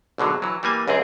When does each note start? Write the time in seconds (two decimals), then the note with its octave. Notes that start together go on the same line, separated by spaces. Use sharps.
0.18 G#1 B2 D3 F#3
0.42 E3 F#3
0.63 E3 G3 A#3 G#5
0.88 C#2 F#2 C4 G#4